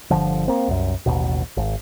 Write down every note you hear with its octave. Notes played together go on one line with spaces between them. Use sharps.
G1 D2 D3 F3
A#3 C4
C2 F#2
A1 D#2 B2
G#1